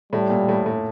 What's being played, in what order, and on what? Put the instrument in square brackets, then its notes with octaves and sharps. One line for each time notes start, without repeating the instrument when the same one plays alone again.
[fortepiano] A2 [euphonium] G3
[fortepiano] A#2
A2
A2